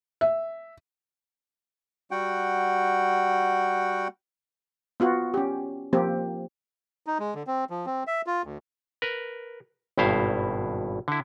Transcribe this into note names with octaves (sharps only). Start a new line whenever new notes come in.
E5
G3 F#4 F#5 G5
B3 F4 F#4
C#4 G4
F3 A#3 C4 G4
D#4
G#3
D3
C4
F3
C4
E5
F4
D2
A#4 B4
G#1 G2 B2 E4 C5 F5
D3 E4